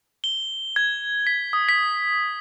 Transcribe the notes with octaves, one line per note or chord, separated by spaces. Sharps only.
G7
G#6
B6
D#6
B6